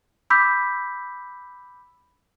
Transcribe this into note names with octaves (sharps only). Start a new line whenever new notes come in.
B5 D6 E6 G6 B6